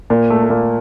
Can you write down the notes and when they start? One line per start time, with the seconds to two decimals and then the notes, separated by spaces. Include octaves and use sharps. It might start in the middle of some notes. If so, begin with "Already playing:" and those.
0.10 A#2 A#3
0.30 A3
0.42 A3
0.50 A#2 A#3